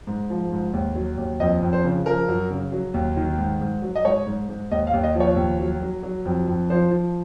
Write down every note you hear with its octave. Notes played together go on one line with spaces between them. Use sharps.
G#2
F3
G#2
D#2
F#3
D#2
F2 D#5
F2
C5
C#3
F3 A#4
F#2
C#3
F#3
D#2
D#3
G#2
G#2
F#3
D#5
G#2 C#5
G#2
G#2
D#2 D#5
F5
D#2
D#5
F3
C#5
D#2
F#3
F#3
F#3
F2
F2
F3 C5
F3